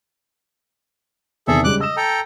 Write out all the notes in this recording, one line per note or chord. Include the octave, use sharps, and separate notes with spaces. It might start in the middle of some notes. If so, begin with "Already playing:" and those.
E2 C3 D#3 G#4 A4 E5
C#3 G3 G#3 D6 F#6
D#5 E6 E7
A4 G5 A#5